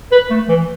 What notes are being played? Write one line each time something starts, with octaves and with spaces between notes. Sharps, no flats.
B4
A3
E3